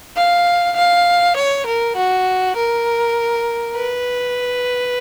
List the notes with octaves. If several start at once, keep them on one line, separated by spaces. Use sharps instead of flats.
F5
F5
C#5
A#4
F#4
A#4
B4